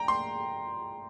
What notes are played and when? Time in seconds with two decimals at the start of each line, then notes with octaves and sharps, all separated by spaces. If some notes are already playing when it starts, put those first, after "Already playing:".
Already playing: G5 A#5
0.08 C6